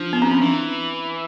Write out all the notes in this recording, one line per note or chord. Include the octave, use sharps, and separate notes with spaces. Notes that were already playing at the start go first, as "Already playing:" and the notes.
Already playing: F3 D4
B3
C4
C#4
E3 D4